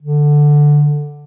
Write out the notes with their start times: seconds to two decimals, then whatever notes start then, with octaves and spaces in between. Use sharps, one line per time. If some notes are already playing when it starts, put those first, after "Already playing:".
0.02 D3